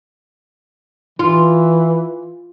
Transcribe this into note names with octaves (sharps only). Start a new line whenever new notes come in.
E3 F4